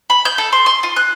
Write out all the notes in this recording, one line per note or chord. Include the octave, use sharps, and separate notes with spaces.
B5
G6
A4
C6
C6
F4
F#6